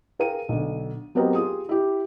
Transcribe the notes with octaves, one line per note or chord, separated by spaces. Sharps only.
G#4 A#4 F5 G5 D#7
B1 D3
F#3 B3 C4 G4 A#4 D#5
F4 G4 G#4 D#6
E4 G4